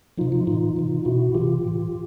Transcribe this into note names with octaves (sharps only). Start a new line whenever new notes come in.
C3 F3 D#4 F4
D#4 F4
A2 E3 D#4 F4
C3 E3
B2 E4 F#4
C3 E3 F4 G4
A2 E3